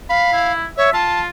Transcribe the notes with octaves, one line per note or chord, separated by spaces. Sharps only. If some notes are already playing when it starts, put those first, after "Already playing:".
F5 B5
E4
C#5 E5
F4 A5